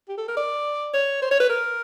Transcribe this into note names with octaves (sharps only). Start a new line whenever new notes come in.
G4
A4
A#4
D5
C#5
C5
C#5
B4
A#4